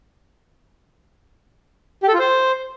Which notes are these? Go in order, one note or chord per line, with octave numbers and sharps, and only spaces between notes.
G4
A4
F4
C5